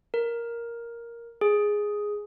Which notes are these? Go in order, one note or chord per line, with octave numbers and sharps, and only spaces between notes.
A#4
G#4